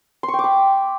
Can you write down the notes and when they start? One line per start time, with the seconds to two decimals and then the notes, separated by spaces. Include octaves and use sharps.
0.23 C6
0.28 C#6
0.34 G5
0.39 D6
0.44 B5